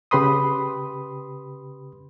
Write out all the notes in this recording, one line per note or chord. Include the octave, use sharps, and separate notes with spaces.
C#3 G4 B4 B5 C6 D#6